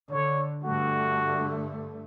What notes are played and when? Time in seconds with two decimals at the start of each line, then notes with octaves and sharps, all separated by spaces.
0.11 D3 C#5
0.64 G2 D3 A3 F#4